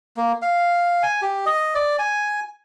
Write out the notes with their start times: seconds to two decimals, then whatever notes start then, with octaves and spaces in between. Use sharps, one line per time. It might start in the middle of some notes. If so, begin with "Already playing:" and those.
0.17 A#3
0.42 F5
1.03 G#5
1.22 G4
1.46 D#5
1.75 D5
1.99 G#5